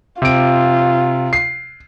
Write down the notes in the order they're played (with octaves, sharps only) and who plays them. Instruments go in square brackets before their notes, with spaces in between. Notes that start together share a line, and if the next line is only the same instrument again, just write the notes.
[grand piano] C3 D7 [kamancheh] F4
[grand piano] C7